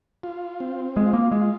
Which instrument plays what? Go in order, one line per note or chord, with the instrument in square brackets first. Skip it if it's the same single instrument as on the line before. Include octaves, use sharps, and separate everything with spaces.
[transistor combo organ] F4
C4
[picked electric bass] G#3 [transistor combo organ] F4
[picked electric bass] A#3
[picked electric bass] G#3 [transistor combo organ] F4